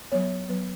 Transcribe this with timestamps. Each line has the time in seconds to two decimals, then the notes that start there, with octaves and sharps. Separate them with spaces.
0.12 F#3 B3 C#5
0.49 F#3 B3 B4